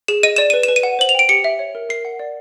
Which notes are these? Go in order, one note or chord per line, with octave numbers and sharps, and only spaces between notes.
G#4 E7
D#5 D#7
D5 E7
B4 D#7
E7
B4
D#7
F#5
C5 F#7
F7
G5 D7
G4 C#7
E5
C#5
A#4
A#4 C7
F#5
D5